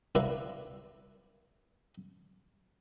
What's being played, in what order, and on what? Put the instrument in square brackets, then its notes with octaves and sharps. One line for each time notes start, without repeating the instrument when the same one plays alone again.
[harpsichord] C2 D4 E4 A#4 B4 F5